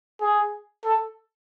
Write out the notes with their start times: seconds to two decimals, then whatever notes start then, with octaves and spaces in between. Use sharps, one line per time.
0.21 G#4
0.85 A4